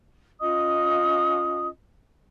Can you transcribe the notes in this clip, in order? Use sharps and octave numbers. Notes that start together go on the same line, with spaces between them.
C#4 F4 D#5 D#6